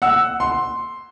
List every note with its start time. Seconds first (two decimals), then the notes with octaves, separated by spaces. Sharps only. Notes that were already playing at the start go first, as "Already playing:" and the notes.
0.02 F#5 E6
0.40 C6